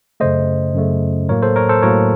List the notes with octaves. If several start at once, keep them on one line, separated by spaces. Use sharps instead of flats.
F#2 C#3 A3 C5 D#5
F#2 C#3 A3
A2 F#3 A#3 A#4 C#5
A4 C5
A#4 C#5
A4 C5
A2 F#3 A#3 A#4 C#5